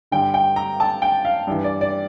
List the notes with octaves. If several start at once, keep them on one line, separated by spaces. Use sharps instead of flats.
G2 D3 G5
G5
A#5
A5
G5
F5
G2 E3
D5
D5